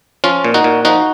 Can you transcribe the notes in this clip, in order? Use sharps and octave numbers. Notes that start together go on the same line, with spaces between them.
F3 C#4 F4
A#2
D#4 F#4
A#2
F3 D#4 F#4